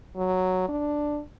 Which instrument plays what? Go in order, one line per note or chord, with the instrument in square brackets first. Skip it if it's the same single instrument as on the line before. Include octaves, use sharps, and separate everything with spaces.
[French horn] F#3
D4